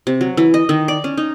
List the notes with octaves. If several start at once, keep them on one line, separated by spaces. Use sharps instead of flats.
C3
F#3
E3
D#5
D#3
D5
C#4
D#4